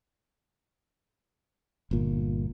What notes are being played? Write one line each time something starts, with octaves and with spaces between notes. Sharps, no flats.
G1 A#2